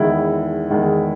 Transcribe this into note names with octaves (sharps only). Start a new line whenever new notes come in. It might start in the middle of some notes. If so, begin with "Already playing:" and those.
Already playing: E2 D#3 G#3 E4
E2 D#3 G#3